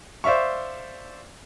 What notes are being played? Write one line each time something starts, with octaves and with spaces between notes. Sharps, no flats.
C5 D5 E5 F5 C#6